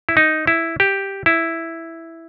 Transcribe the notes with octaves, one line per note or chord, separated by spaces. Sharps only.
E4
D#4
E4
G4
E4